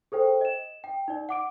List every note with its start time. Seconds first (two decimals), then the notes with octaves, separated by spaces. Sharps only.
0.12 G#4 A4 C5 G5
0.41 D#5 E7
0.84 G5
1.08 D#4 D5
1.29 F#5 D6 D7